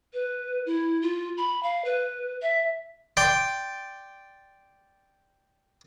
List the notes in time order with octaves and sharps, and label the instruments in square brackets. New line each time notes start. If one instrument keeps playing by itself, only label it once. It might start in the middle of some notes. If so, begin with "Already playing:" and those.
[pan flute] B4
E4
F4
B5
F5
B4
E5
[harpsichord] D5 G5 C6